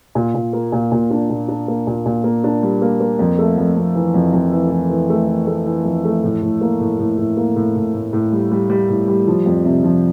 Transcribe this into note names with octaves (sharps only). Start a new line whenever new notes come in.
A#2
A#2
A#3
A#2
A#2
D4
A#2
D4
A#3
A#2
A#2
A#3
D4
G3
A#3
A#3
F2
A3
F2
F2
E3
F2
F2
E3
E3
E3
A3
E3
A3
E3
F2
A3
A2
A2
A#3
A2
A2
A2
A#3
A2
A2
A2
A2
G3
G3
G3
A2
G3
F3
F2
C3
F3